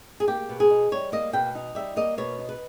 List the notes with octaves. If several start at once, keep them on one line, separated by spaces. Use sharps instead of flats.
G#4
A#3 G4
B2
G#4
D#4
G3 C#5
A#3 D#5
B2 G5
D#4
G3 E5
A#3 D#5
B2 C#5
D#4
B4